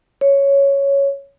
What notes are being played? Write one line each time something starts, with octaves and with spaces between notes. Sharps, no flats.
C#5